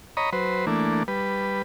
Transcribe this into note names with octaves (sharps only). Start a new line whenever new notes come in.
C#5 D#5 A#5 B5
F#3 B4 C5
E3 A3 A#3 D4
G3 B4